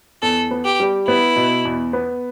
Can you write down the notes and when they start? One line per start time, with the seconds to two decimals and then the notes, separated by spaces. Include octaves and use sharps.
0.22 E2 A4
0.51 B3
0.65 G4
0.80 G3
1.07 B3 E4
1.36 B2
1.65 E2
1.93 B3